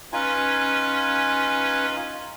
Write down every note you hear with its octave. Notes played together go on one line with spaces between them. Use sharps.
C#4 D#4 F4 B4 G#5